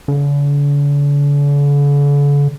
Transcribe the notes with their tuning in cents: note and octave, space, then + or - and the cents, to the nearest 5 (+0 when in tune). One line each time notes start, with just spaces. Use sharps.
D3 -45